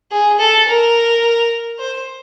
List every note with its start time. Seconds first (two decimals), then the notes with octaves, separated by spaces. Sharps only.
0.11 G#4
0.39 A4
0.68 A#4
1.79 C5